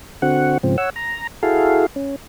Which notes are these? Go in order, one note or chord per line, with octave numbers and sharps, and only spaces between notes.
D3 C4 F#4 F#5
G#2 C#3 F3 C4
C#5 F#5 E6
A#5
E4 F#4 G#4 A4 F5
C#4